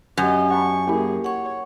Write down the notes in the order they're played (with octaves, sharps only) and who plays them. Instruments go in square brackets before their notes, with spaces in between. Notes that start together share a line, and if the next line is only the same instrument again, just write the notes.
[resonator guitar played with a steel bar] F#2 [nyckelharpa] G4 D#5 [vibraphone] G#5
[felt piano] F#5 A5 B5 [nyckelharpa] C#6
[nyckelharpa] A#3 G#4 [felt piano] E4 G4
[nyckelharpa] C#5 [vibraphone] F#5 C#6